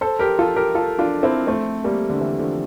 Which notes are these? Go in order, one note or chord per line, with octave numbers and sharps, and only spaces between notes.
A4 C5
G4 A#4
F4 A4
G4 A#4
F4 A4
D4 F4
C4 E4
A3 C4
G3 A#3
D3
E3
D3 F3